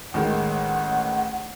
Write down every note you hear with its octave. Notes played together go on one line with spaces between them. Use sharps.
A1 D#3 G#3 F#5